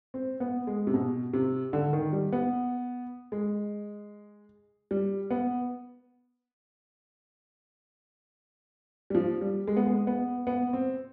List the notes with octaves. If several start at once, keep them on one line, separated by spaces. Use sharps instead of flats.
C4
B3
G#3
C3
B2
C3
D3
D#3
G3
B3
G#3
G3
B3
G3
F3
G3
G#3
B3
G#3
B3
B3
C4